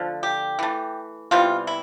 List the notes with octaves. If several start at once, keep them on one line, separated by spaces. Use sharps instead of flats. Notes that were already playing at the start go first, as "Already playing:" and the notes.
Already playing: D3 F3 A3
G4
E3 A3
C3 E3 G3 B3 F4
E4